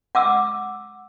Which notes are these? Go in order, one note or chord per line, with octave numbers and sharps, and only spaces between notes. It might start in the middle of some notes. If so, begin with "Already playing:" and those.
F#5 D6 E6